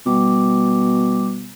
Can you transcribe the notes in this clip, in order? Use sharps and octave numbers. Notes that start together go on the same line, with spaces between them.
B2 G3 D6